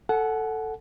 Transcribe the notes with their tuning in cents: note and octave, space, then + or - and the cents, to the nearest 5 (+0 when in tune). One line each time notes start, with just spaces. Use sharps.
A4 +5 F#5 +5 A5 -45